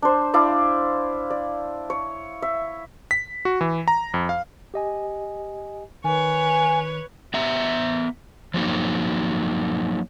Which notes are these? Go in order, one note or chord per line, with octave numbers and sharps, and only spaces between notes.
D4 C5
D4 E4 D5 F5
D5
C#5
E5
B6
F#4
E3
A#5
F2
F5
G4 D#5 G#5
D#3 B4 C#5 G#5
B3 E5 A#5
F3 F#3 A#3 D#4